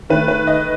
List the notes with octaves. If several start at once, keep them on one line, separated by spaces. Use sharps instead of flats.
D#3 A3 B4
B4
D#5